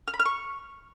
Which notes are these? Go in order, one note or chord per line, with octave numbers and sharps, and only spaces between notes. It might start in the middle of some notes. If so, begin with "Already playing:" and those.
F6
B5
F6
C#6